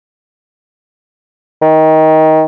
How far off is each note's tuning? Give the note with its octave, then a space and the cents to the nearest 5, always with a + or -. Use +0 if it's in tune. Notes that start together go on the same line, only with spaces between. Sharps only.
D#3 +20